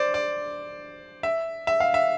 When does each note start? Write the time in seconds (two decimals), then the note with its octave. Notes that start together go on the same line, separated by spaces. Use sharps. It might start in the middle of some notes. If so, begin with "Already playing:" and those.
Already playing: C5 D5
0.14 D5
1.23 E5
1.67 E5
1.80 F5
1.94 E5